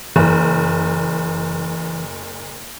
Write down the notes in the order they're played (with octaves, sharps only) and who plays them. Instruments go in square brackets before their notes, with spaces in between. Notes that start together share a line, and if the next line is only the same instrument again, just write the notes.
[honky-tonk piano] F#1 [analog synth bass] E3